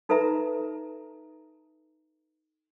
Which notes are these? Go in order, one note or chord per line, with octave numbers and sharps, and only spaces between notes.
D#4 A4 B4 E5 A#5